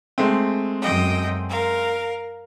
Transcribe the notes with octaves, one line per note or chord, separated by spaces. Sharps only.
G#3 A3 C4
F#2 D#5 G5
A#4 F5